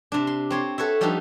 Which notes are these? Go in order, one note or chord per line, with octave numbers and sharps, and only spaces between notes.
C3 D4
C6
C4 C#5 C6
F#4 A4 B4 C#5 E5
F3 G3 D4 D#4 A4 B4